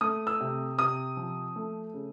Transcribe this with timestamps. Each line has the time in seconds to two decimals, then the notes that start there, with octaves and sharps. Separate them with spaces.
0.01 A3 D#6
0.27 E6
0.41 C3
0.78 C3 D#6
1.17 F3
1.56 A3
1.94 C#3